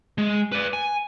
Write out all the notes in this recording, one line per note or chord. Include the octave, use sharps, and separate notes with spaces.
G#3
B4 D5
G#5